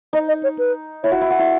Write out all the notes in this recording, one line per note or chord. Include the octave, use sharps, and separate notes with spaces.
D#4 D#5
D#5
C#5
B4
E4 C#5
F#4
E4 E5
F#4
E4